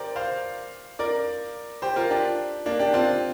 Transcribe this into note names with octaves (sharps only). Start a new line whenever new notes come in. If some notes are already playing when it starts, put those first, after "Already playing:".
Already playing: G4 A#4 C5 D5
C5 F5
A#4 D5
G4 C5
F4 A#4
D4 G4
A#3 D4
D4 G4
C4 F4